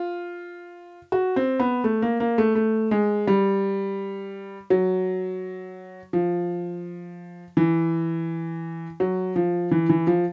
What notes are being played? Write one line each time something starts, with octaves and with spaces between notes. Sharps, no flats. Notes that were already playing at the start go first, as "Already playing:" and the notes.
Already playing: F4
F#4
C4
B3
A3
A#3
A#3
A3
A3
G#3
G3
F#3
F3
E3
F#3
F3
E3
E3
F3